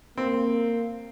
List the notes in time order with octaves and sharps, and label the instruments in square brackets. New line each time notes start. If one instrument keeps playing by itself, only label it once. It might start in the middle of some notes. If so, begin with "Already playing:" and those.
[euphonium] A#3 [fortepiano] C4